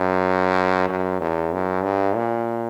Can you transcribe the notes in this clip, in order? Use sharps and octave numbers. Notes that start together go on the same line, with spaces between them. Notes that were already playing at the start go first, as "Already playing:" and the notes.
Already playing: F#2
F#2
E2
F#2
G2
A#2